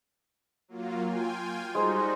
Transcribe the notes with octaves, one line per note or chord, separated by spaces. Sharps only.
F#3 A#3 F4
F4 G5 G#5
G3 G#3 D#4 F#4 C5 A#5